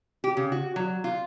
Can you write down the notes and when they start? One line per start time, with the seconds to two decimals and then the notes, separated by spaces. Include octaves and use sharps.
0.24 G4
0.37 C#3
0.52 F#4
0.76 F#3
1.04 F4